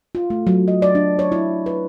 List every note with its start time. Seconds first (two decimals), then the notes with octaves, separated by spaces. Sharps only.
0.15 F4
0.30 A3
0.47 F#3
0.68 D#5
0.82 D5
0.95 D4
1.19 C#5
1.32 E4
1.66 B4